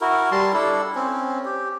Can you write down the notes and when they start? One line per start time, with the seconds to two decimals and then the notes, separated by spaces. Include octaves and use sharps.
0.01 E4 F#4 A#4
0.32 G3 A5 C6
0.54 D4 E4 A4
0.96 C4 C#4
1.45 G4